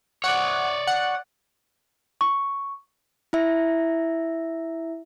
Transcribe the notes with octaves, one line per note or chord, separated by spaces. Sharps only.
C#5 D5 F#5
F#5
C#6
E4 E5